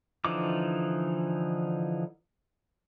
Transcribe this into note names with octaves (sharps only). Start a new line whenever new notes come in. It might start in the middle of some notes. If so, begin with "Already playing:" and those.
D3 E3 F3 D#4 D6